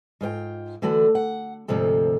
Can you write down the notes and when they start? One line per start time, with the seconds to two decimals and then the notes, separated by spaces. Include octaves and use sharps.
0.21 G#2 F4 C5 G5
0.82 D3 E3 A3 F#4 D5
1.15 F#5
1.68 D2 G#2 C3 F3 A4